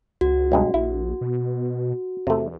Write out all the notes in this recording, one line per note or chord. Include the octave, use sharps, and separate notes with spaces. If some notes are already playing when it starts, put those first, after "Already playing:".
C#2 F#4
B1 G2 G#3
A#1 E4
B2
E2 C3 A3